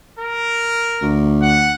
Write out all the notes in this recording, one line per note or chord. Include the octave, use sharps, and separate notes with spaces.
A#4
D2
F#5